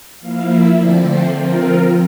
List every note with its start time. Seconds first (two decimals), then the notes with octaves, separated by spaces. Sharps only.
0.20 F3 A#3 E4 F5
0.49 E5
0.77 D3 F3 A3 C4 D5
1.07 C5
1.35 F3 C4 F4 A#4